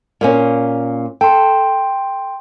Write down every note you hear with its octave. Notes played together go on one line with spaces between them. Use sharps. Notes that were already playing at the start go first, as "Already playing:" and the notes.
A#2 A#3 C#4
A4 G5 C6